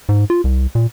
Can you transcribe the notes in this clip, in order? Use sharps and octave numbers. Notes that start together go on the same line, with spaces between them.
G#2
F4
C2
A#2